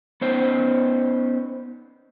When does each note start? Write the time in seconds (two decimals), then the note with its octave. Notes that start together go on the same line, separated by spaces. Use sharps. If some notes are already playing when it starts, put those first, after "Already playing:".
0.21 B3 C#4 D#4 C5